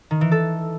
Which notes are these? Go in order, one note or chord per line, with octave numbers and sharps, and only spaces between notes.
D#3
E3
A4